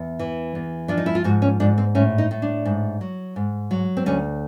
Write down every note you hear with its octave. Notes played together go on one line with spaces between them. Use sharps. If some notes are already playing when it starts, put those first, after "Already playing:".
Already playing: E2
E3
E2
F3 D4
D#4
E4
F4
G#2 F#4
C#4
G#2 D4
C4
A2 C#4
D#4
A2
D4
G#2
F#3
G#2
F#3
C4
D2 C#4